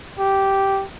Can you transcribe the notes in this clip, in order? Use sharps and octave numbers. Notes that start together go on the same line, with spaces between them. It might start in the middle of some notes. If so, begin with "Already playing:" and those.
G4